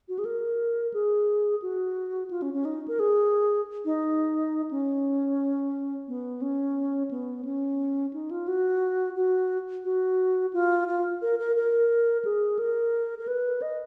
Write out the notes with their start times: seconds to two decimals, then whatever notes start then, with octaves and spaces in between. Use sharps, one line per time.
0.09 F#4
0.19 G#4
0.25 A#4
0.94 G#4
1.62 F#4
2.31 F4
2.42 C#4
2.54 C#4
2.65 D#4
2.88 A#4
2.99 G#4
3.85 D#4
4.71 C#4
6.08 B3
6.42 C#4
7.11 B3
7.45 C#4
8.13 D#4
8.31 F4
8.48 F#4
9.16 F#4
9.85 F#4
10.53 F4
10.88 F4
11.22 A#4
11.39 A#4
11.56 A#4
12.25 G#4
12.59 A#4
13.19 A#4
13.28 B4
13.62 D#5